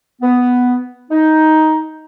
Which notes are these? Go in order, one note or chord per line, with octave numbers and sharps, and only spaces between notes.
B3
D#4